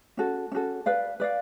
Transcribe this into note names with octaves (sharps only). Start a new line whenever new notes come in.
C#4 F#4 A4
C#4 F#4 A4
B4 D5 F5
B4 D5 F5